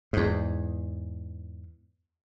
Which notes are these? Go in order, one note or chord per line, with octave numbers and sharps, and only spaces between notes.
E2 G#2